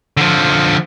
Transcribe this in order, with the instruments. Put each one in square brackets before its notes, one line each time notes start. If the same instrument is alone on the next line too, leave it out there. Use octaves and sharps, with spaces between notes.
[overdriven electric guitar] D3 F3